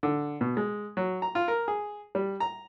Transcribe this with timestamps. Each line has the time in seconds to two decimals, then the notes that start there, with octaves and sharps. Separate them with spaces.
0.03 D3
0.41 B2
0.57 G#3
0.97 F#3
1.22 A#5
1.35 F4
1.48 A#4
1.68 G#4
2.15 G3
2.40 A#5